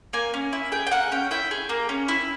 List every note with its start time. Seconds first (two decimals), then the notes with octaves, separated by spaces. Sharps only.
0.13 A#3 G#5
0.34 C#4
0.53 E4
0.72 G#4 G5
0.87 G5
0.91 A#3 F#5
1.12 C#4 G5
1.31 E4 G5
1.51 G#4
1.69 A#3
1.89 C#4
2.08 E4